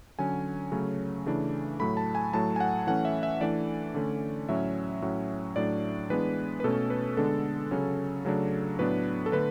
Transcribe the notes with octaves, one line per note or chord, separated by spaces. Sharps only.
D3 F#3 C#4 G#5
C#3 F#3 A3 C#4
C#3 E3 A3 D4
A2 F#3 A3 B5
A5
G#5
A2 F#3 A3 A5
G#5
F#5
E3 A3 C#4 F#5
E5
E5
E3 A3 D4 D5
D3 A3 C#4
A2 F#3 C#4 E5
A2 F#3 C#4
A2 F#3 A3 D4 D5
E3 G#3 B3 D4 B4
B4
B2 A3 C#4 A4
B4
D3 G#3 B3 D4 A4
C#3 F#3 C#4
C#3 F#3 A3 D4
A2 F#3 B3 D4 B4
A4
D3 A3 B4